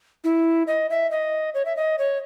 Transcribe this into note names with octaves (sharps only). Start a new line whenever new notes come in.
E4
D#5
E5
D#5
C#5
E5
D#5
C#5